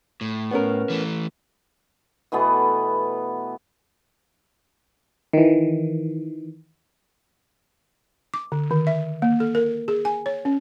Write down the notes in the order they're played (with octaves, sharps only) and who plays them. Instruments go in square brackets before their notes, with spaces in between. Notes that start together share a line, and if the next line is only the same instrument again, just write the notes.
[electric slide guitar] A2
[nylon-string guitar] B3 C#4 A#4
[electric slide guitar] E3 A3
[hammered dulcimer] B2 E3 A3 B3
[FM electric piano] D#3 E3
[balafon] D6
D3
D#3
E5
A#3
A4
A#4
G#4
G#5
C#5
C#4